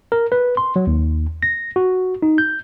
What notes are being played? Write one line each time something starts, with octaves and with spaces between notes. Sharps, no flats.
A#4
B4
C6
F#3
D#2
A#6
F#4
D#4
G6